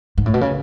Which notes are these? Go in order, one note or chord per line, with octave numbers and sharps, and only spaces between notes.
G#2
A2
B2
C#3